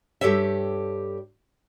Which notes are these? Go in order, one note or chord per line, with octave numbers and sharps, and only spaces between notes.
G2 E3 G4 A4 C#5 E5